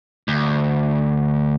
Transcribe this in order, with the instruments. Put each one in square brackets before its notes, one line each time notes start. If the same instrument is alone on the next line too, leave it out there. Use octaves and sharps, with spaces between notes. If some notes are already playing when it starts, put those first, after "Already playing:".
[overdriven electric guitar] D2